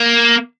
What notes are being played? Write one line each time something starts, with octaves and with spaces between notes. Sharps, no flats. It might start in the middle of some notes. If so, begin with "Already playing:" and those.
Already playing: A#3